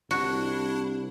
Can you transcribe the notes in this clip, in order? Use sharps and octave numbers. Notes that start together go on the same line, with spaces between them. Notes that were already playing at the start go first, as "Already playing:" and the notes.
C2 D4 E4 F#4